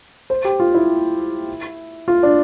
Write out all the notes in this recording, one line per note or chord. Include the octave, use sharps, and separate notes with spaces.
C5
G4
F4
E4
F4
D4